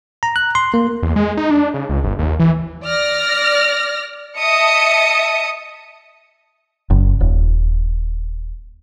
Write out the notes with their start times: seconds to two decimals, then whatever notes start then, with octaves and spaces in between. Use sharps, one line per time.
0.23 A#5
0.36 F#6
0.55 C6
0.74 A#3
1.03 E2
1.16 G#3
1.37 D#4
1.51 D4
1.74 C#3
1.89 C#2
2.04 G1
2.19 D#2
2.40 E3
2.84 D5 F6 A#6
4.38 D#5 E5 A5 D#6 C#7
6.90 F#1
7.20 D#1